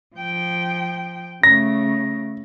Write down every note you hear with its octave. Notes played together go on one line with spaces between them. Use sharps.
F3 G5
C#3 A3 A#6